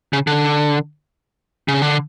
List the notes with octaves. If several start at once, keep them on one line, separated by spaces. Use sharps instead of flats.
C#3
D3
C#3
D3